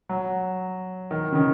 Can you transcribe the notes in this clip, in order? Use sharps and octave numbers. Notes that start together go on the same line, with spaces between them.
F#3
D#3
C#3
D#3